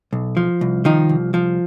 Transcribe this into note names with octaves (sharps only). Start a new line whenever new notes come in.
B1
F3
C2
D#3 F3 D#4
C2
F3